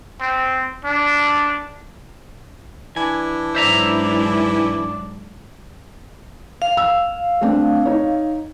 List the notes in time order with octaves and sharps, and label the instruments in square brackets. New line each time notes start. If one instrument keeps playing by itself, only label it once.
[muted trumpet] C4
D4
[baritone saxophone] E3 [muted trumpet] D4 [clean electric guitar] G#5
[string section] G#2 F#3 D4 [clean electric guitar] C5 E5 A#5 [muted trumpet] D5
[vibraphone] F5
[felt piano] E6
A3 C4 D4
D#4 C#5